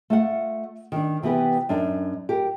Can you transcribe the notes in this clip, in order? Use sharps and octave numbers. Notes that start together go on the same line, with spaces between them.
A3 F4 F#5
D#3 D4
C3 E3 B3 G4 B4
F#2 D4 D#4
G4 A#4